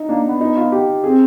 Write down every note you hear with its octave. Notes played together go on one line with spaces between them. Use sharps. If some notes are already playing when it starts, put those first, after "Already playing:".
Already playing: D#4
A#3 D4
B3
D#4
F4
G4
C4 G#4